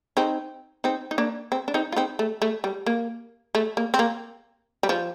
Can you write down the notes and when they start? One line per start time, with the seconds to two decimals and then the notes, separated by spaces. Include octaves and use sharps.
0.17 C4 D#4
0.84 C4 D#4
1.11 D#4
1.18 A#3 D4
1.52 C4
1.68 D4
1.74 C4 D#4
1.92 F4
1.96 C4 D#4
2.19 A3
2.42 A3
2.64 G3
2.86 A#3
3.55 A3
3.77 A#3
3.94 C4
3.99 A#3
4.83 G3
4.89 F3